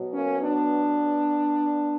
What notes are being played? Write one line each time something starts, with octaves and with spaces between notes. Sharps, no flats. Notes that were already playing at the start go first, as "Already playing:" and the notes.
Already playing: B2 F#3
A#3 C#4
B3 D4